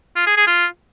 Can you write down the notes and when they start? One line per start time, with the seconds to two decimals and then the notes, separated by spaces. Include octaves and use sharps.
0.16 F4
0.27 G#4
0.37 G#4
0.47 F4